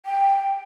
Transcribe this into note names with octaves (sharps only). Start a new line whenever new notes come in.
G5